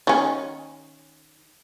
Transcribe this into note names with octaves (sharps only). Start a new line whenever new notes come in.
D#3 C#4